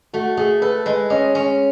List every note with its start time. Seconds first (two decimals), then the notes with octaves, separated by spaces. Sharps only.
0.13 A3 F#4
0.37 A3 G#4
0.62 A4 B4
0.86 G#3 B4
1.10 C#4 D#5
1.35 C#4